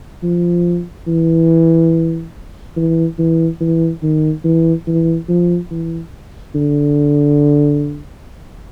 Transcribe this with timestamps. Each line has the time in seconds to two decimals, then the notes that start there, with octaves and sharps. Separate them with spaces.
0.23 F3
1.07 E3
2.76 E3
3.18 E3
3.61 E3
4.03 D#3
4.44 E3
4.87 E3
5.29 F3
5.71 E3
6.55 D3